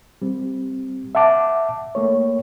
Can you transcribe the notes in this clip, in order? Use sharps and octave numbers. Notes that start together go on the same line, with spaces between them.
G3 C4
E5 F#5 A5 D6
A3 A#3 C#5